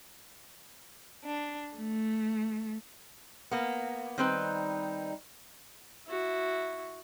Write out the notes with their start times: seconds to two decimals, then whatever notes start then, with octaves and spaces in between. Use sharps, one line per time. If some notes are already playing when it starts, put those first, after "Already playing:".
1.24 D4
1.76 A3
3.51 A#3 B3
4.18 D#3 G3 C4 D#4 B4
6.07 E4 F#4